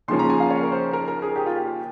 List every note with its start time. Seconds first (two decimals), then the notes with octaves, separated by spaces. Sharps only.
0.08 D#2 C#3 F3 A#3 C#4 C6
0.19 A#5
0.30 G#5
0.40 F5
0.51 C#5
0.63 A#4
0.72 C5
0.93 A#4
1.08 A#4
1.22 G#4
1.36 G4
1.46 F4
1.56 G4